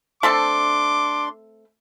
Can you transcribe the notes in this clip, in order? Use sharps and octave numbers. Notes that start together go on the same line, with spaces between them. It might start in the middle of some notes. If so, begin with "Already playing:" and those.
A3 C4 D4 A4 C6 D6